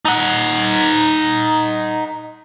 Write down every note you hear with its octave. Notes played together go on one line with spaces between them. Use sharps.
D#4 F#5